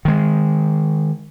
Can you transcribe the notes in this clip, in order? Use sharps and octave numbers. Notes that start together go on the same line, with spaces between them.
D#3 G#3